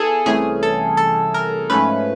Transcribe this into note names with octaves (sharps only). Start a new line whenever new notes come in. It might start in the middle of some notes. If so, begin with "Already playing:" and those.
Already playing: B3 E4 G#4 A4
C2 C3 E3 A3 C#4 G#4
A4
A4
A#4
G#2 F3 A3 C#4 B4